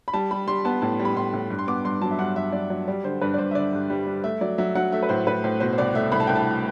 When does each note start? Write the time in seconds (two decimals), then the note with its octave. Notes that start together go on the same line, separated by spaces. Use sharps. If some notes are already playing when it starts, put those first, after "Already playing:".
0.08 B5
0.14 G3 A5
0.31 G3 B5
0.47 G3 C6
0.65 B3 A5
0.82 A2 A5
0.99 G3
1.05 B5
1.16 A2 C6
1.33 A2
1.50 G2
1.59 C6
1.67 B3 D6
1.84 G2 C6
2.02 F#3 A5
2.11 E5
2.19 G2 F#5
2.36 G2 E5
2.52 F#3 D5
2.70 F#3 D5
2.88 G3 D5
3.04 D3 C5
3.21 G2 B4
3.34 D5
3.38 G2 C5
3.51 E5
3.55 D3 D5
3.73 G2
3.90 G3
4.07 G3
4.24 A3 E5
4.41 F#3 D5
4.58 F#3 E5
4.75 F#3 F#5
4.92 A3 E5
5.03 B4
5.09 A2 C5
5.27 A2 B4
5.44 A2 C5
5.60 B2 C5
5.73 C5
5.78 C2 D5
5.95 A3 E5
6.12 C2 B5
6.20 A5
6.27 C2 G5
6.36 A5